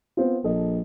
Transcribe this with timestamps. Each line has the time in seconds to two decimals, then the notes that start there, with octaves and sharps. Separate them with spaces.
0.17 B3 C4 F4
0.44 A#1 A4 D#5